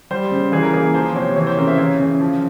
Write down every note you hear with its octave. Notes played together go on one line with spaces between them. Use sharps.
G3 C5
C#3
E3 G#4
A#4
A#3 G#4
F3 C5
C3 C#5
E3 C#5
C5
C#3 A#4
E5
E3 C#5
C#3
F3